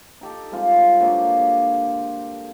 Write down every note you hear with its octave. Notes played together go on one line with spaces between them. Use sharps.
D#4 G4 A4
G3 G#3 C4 F4
D3 F#3 A#3 G4
G4